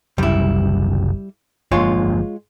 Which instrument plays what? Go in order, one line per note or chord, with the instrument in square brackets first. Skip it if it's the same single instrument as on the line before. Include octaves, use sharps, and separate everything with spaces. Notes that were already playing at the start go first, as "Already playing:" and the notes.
[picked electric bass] F#1 C2 F#2 [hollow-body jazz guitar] G3 E4
[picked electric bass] G1 F3 A#3 [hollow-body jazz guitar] G#3 F4 C#5